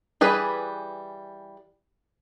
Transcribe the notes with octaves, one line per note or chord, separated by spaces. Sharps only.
E3 G3 G#4 B4